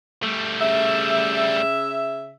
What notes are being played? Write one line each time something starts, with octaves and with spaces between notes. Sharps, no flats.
G3 A3
C#3 E5